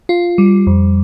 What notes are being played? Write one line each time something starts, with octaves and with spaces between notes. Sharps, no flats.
F4
G3
F2